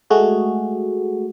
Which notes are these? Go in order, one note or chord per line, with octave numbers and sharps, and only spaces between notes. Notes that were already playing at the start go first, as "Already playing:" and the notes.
G#3 A3 F#4 G#4